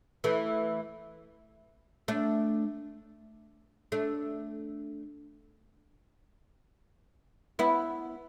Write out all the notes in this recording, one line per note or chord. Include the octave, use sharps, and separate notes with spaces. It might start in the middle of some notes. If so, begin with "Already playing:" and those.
E3 A3
A3 D4
A3 D4
B3 E4